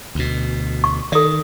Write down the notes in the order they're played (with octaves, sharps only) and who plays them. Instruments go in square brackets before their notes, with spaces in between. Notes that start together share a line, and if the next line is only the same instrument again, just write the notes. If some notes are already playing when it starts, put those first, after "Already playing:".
[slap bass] D2 B2
[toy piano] C#6
[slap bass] D#3 [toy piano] A4 D5